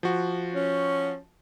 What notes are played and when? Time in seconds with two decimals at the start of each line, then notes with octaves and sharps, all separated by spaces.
0.03 F3 F#4
0.54 C#4